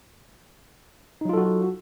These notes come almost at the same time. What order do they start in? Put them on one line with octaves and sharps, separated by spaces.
D#4 F#3 F4 A4 F#4